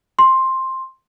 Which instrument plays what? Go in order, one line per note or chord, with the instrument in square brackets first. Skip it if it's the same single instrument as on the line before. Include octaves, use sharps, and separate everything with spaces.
[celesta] C6